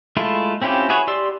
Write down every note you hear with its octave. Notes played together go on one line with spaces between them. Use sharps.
G#3 A3 E4 F4
C4 C#4 E4 F4 G4
E4 F#4 G#4 B4 C#5
G4 D5 C6 E6